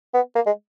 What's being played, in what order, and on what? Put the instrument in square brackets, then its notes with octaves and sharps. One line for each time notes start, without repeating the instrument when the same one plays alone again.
[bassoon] B3
A#3
G#3